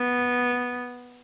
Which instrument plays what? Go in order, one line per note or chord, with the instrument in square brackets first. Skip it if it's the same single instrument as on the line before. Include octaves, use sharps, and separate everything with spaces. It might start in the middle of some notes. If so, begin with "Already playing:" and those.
Already playing: [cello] B3